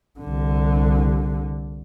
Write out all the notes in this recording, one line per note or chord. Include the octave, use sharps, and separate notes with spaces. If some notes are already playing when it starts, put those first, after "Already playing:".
C2 D3